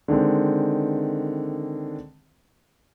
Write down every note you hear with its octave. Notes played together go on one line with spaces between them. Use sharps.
D3 D#3 G#3 C4